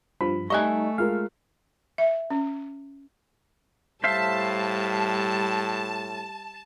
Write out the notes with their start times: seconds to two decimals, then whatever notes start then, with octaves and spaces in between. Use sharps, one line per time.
0.21 G2 F3 B5
0.50 G3 A3 D#4 D#5 E5 G#5 C#6 F#6
0.98 G#3 F4 A#4 F5
1.98 E5
2.30 C#4
4.04 A2 G3 C5 E5 F5 A5